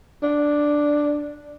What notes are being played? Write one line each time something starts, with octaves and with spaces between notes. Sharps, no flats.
D4